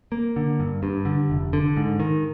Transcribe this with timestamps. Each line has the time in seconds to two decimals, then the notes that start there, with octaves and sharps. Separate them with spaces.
0.12 A#3
0.36 D3
0.60 G2
0.83 G2
1.05 D3
1.30 F1
1.53 D3
1.77 G#2
2.00 D#3